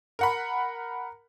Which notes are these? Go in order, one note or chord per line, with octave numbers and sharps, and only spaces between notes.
A#4 F#5 B5